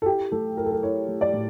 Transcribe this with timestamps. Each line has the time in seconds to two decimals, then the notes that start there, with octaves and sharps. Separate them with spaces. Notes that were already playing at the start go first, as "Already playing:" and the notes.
0.02 A4
0.06 E4 G4
0.32 A3 A4
0.57 E4 A#4
0.65 A4
0.72 A#4
0.83 E4 C#5
1.08 A3
1.21 D5
1.33 A2